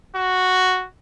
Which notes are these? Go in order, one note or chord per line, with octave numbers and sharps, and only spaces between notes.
F#4